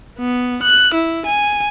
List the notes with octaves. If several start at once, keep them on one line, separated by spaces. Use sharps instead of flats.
B3
F#6
E4
G#5